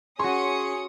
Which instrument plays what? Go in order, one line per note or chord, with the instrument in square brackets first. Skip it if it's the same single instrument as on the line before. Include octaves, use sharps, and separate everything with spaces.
[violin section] C#4 D#6 C#7 [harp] F#4 C#5 [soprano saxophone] G#4 [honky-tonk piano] C6